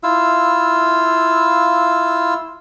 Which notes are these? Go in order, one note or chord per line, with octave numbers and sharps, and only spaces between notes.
E4 F4 F5 E6